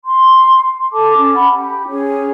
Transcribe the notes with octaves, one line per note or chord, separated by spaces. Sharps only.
C6
A4 A5 D6
C#4
F#5 B5
G4
C#4 G#4 C#5